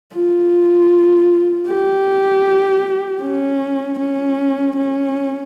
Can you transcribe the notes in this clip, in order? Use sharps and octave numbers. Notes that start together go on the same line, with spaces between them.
F4
G4
C#4
C#4
C#4